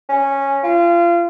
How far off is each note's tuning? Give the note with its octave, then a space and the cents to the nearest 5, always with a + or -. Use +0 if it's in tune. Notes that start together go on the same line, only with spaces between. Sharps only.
C#4 -10
F4 -30